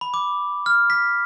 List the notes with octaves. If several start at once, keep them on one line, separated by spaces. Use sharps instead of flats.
B5
D6
F6
B6